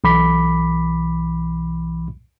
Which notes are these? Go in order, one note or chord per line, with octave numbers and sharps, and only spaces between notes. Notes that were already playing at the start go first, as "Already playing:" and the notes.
B1 E3 B5 D6 B6